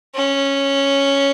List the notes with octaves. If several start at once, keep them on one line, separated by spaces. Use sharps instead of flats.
C#4